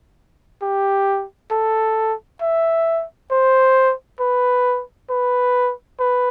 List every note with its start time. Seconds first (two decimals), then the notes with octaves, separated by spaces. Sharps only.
0.62 G4
1.51 A4
2.42 E5
3.31 C5
4.20 B4
5.10 B4
6.00 B4